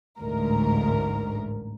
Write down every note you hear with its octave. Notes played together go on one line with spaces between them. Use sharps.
A1 D2 G#2 A#4